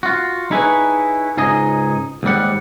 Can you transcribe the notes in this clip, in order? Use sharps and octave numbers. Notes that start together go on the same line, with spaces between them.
F4 F#4
D#4 E4 G#4 A4 B4 C#5
C#2 G#2 D#4 G#4 D#5
D#2 G#2 G3 F#5